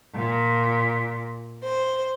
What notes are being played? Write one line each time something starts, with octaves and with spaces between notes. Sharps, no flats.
A#2
C5